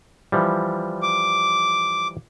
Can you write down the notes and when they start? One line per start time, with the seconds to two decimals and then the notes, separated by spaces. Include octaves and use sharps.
0.32 E3 F3 G3
1.03 D6